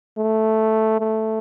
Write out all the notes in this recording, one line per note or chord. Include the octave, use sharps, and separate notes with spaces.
A3
A3